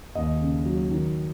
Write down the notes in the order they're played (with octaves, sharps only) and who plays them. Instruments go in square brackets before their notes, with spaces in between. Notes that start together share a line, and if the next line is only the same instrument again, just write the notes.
[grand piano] D#2 D#5
C#3
F#3
D#3